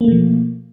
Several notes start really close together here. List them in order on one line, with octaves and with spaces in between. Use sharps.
A#3 A3 B2 F3